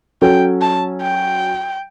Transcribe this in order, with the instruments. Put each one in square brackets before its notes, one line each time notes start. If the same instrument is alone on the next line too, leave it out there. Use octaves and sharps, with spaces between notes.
[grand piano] F#3 C#4 F#4 A4 [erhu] G5
[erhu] A5
G5